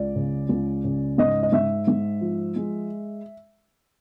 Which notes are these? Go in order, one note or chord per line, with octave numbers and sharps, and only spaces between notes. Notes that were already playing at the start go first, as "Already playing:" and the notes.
Already playing: C#2 D5
C#3
C#2
C#3
G#2 D#5
D#5
G#2 E5
G#2
F3
G#3